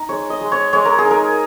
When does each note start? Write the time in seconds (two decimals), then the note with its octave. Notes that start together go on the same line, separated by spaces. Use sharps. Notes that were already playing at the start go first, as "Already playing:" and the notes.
Already playing: D#4
0.09 G#3 C#5
0.30 D#5
0.41 G#3
0.52 C#5
0.73 G#3 C#5
0.85 A#4
0.98 G#4
1.05 D#4
1.11 A#4